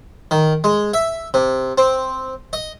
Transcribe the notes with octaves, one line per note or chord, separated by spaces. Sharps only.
D#3
G#3
E5
C3
C4
D#5